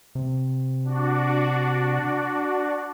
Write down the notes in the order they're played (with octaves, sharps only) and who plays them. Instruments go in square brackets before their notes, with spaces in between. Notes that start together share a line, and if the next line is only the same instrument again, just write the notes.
[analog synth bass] C3
[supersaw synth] D4 F#4 D5